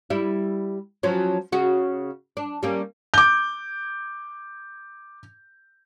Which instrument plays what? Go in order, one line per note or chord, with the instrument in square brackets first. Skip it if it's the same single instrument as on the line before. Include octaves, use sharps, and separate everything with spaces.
[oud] G3 E4
F3 F#3 C#4
C#3 F#4
D4
G3 A#3 C#4
[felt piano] D6 G6